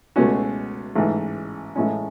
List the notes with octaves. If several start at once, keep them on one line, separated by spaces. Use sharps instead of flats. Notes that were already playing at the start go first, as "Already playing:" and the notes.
C#2 B2 A3 C#4 F#4
A1 G#2 E3
A1 A2 G#3 C#4